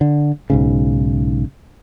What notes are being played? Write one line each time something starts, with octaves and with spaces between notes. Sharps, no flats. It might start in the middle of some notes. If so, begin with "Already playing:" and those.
D3
B1 G#2 C#3